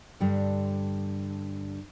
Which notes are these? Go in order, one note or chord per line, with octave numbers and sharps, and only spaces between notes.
G2 D3 G3